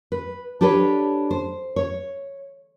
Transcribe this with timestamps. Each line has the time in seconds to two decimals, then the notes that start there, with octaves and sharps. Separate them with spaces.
0.12 B4
0.61 D4 G4 A4 B4 C#5 D5
1.31 C5
1.76 C#5